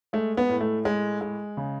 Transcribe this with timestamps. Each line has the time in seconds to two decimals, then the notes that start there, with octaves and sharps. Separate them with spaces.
0.13 G#3 A3
0.37 B3
0.49 A2
0.61 A3
0.85 G#3
1.21 G#3
1.57 C#3